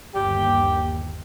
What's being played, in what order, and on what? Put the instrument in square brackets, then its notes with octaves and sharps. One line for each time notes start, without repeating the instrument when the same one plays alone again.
[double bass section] G1 D#2 [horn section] G4